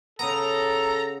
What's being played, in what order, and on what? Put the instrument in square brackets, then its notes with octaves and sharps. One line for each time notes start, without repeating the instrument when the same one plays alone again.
[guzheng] C#3 B3 [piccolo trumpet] A4 [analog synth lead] A#5